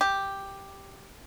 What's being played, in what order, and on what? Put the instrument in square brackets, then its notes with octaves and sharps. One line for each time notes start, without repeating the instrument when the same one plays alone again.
[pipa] G4